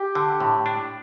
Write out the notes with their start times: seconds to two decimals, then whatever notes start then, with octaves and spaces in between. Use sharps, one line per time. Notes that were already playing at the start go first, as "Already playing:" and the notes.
Already playing: G4
0.15 D3
0.40 A2
0.66 D4